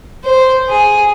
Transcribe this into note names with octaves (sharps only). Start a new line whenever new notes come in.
C5
G#4